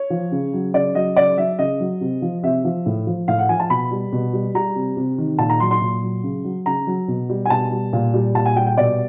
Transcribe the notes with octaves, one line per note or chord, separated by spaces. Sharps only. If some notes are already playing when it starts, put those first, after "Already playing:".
Already playing: C#5
F3
C#3
F#3
C#3 D5
F#3 D#5
C#3 D5
F#3 E5
C#3 D#5
F#3
C3
F3
C3 E5
F3
A2
F3
A2 F5
F#5
F3 G#5
A5
B2 B5
G3
B2
G3
G3 A#5
C3
C3
D#3
A#2 A5
A#5
F#3 C6
C6
A#2
F#3
C#3
F#3
C#3 A#5
F#3
B2
G3
G#5
B2 A5
G3
A#2
G3
A#2 A5
G#5
G3 G5
G5
B2 D5